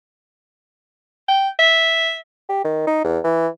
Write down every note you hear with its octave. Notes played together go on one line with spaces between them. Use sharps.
G5
E5
G4
D#3
D#4
E2
E3